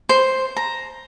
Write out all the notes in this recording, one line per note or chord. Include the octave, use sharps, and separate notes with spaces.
C5
A#5